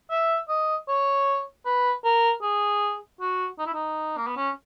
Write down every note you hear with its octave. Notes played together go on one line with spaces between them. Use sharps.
E5
D#5
C#5
B4
A#4
G#4
F#4
D#4
E4
D#4
A#3
B3
C#4